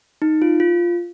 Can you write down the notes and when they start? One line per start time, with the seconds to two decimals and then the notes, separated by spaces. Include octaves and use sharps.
0.22 D#4
0.42 F4
0.60 F4